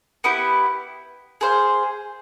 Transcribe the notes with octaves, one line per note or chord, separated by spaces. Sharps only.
B3 E4 G4
G#4 C5 F5